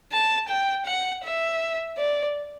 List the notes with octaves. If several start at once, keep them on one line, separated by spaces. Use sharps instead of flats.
A5
G5
F#5
E5
D5